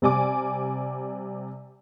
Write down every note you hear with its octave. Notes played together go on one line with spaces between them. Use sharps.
C3 G3 D5 G#5 D6